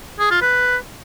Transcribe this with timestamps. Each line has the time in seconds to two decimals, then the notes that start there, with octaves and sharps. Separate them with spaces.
0.20 G#4
0.31 F4
0.42 B4